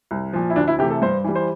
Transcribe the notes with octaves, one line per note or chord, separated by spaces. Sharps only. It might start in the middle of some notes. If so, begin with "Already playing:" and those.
C2
A#2 F3
E4
D2 D4
E4
C3 E3 A3 G4
A4
G2 C5
E3 G3
C5